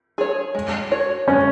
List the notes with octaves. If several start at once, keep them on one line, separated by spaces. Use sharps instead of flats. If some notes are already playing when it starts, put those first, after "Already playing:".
G#4 C#5
G#3
F#4 C#5
G#3 C#4